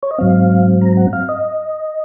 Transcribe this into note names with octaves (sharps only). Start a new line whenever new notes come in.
C#5
D#5
G#2 F#3 C4 F5
A#5
F#5
F5
D#5